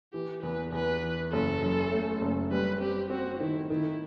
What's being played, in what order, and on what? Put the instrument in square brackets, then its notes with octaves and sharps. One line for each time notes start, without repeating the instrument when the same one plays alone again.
[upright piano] E3 [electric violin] G4
[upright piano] E2 [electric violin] B4
[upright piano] E2 [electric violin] B4
[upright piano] E3
[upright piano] F#1 [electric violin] A4
[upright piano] F#2
A3
F#1
[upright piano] G3 [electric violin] B4
[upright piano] C4 [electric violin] G4
[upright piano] C4 [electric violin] F#4
[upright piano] D#3 [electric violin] E4
[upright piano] D#3 [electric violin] E4